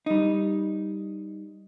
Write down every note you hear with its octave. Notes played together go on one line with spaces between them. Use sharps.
G3 D#4